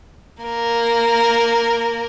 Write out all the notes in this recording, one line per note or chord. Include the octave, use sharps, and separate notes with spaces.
A#3 A#4